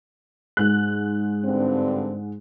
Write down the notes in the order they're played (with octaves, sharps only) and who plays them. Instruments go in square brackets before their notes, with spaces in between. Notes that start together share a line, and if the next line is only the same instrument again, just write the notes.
[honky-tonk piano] G#2 F#6
[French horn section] G2 D3 C4